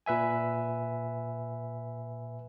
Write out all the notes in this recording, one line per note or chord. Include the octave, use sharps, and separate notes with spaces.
A#2 B4 E5 G#5